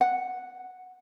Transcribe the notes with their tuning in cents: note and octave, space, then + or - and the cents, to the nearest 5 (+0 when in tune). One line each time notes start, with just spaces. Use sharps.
F#5 -5